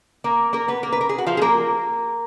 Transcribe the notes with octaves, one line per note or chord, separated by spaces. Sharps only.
A#3 A#4
A#3 A#4
B3 B4
A#3 A#4
B4
A#4
G#4
F#4
F3 F4
G#4
A#3 A#4